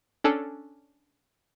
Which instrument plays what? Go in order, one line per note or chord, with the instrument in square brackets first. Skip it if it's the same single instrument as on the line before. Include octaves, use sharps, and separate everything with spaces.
[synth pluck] C#4 D4 A4